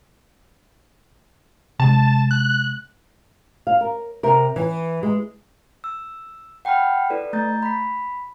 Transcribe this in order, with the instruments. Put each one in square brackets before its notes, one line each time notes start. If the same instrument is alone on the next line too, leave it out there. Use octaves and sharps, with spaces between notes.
[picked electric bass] C3 G#3 [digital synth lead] A5
[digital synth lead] F#6
[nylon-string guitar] F5
A#4
C3 A#4
E3
G#3
[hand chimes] E6
F#5 G5 A5 B5 F6
E4 A4 B4 D5
A3 A#5 G6 A6
B5 B6